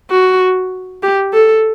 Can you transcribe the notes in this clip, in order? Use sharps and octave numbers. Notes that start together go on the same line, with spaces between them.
F#4
G4
A4